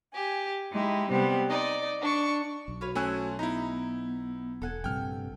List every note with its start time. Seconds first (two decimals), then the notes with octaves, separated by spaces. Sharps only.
0.13 G4 G#5
0.72 G#3 D#4 E4 G4
1.10 C3 G3 B3 C4 G4
1.47 D#4 D5 D#5
2.01 D4 C#6
2.68 B1
2.81 F#4 B4 C#5 F5
2.95 A3 C#4 C5 G#5 E6 F#6
3.39 B3 D#4 E4 A#5 B5
4.62 E1 A4 F#5 G#5
4.84 A#1 G2 C3 G5 F6